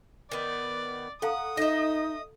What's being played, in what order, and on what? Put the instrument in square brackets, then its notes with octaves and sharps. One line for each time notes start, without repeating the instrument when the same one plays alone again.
[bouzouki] D#3 B3 [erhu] D5
[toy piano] A4 F5 A#5 [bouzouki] F#5 [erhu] D#6
[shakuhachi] D#4 [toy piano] A4 [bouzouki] D#5 E5